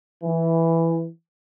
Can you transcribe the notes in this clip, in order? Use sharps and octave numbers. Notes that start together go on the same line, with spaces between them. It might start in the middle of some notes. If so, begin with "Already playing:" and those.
E3